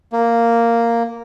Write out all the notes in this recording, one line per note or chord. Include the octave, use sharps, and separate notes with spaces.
A#3